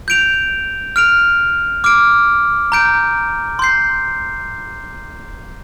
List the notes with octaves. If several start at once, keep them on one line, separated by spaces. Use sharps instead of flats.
G6 D7 F7
F6 D7 F7
D6 F6 D7
A#5 G6 D7
C6 G6 C7